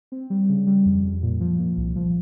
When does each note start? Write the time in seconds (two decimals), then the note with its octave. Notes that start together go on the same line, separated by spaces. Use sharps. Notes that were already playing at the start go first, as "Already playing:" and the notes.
0.12 C4
0.30 G3
0.49 C#3
0.67 G3
0.86 F2
1.03 F2
1.22 A#2
1.41 F3
1.59 A#2
1.77 C2
1.96 F3